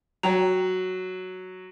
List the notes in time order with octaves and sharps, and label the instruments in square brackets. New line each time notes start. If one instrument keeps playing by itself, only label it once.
[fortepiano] F#3 [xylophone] C#5 G5 A#5